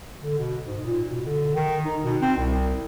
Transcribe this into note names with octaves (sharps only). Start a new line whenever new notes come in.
D3
B2
G#2
A#2
B2
D3
D#3
D#4
B2
C4
C2